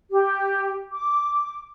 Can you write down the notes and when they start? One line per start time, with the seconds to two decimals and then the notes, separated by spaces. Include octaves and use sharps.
0.10 G4
0.91 D6